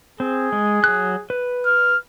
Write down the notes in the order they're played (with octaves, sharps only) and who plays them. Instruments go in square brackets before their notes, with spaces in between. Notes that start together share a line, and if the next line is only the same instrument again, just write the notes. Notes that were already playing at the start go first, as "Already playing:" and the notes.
[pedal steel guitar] C4 [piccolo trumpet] G#4
[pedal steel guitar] G#3
F#3 F#6
B4
[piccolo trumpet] F6